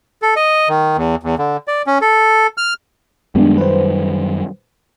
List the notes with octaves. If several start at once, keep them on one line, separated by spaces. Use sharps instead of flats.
A4
D#5
D#3
E2
E2
D3
D5
C#4
A4
F6
F#2 D#3 G3 G#3 B3 D4
B4 C5